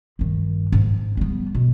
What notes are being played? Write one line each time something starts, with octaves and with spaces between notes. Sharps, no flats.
G2 D#3
G#2
G3 B3
B2